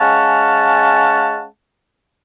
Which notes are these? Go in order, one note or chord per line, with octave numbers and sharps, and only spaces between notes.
G#3 C#4 F5 F#5 A5